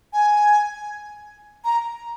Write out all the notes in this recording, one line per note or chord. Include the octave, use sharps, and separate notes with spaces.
G#5
A#5